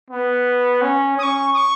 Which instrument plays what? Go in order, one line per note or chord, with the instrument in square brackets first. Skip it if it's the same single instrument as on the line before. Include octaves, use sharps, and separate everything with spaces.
[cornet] B3
C#4
[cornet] C#4 [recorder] D#6
[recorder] C#6
D#6
C#6